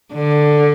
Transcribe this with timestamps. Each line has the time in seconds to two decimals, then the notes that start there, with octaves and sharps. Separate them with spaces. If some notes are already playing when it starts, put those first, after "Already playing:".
0.14 D3